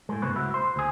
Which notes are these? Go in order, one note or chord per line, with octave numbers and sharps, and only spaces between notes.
A2 G#3
G2 C3 A#3 C4 B4 C#5
C#2 E4 F#4
C5
D2 G#4